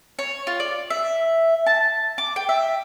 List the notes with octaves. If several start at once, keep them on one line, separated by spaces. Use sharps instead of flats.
C#5
F4
D5
E5
A5
D6
G5
E5